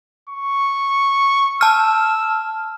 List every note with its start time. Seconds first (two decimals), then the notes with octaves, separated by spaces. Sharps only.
0.29 C#6
1.61 A5 E6 F6